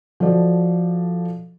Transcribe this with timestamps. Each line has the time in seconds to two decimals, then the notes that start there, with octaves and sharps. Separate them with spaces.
0.20 F3 F#4 A4 D5 D#5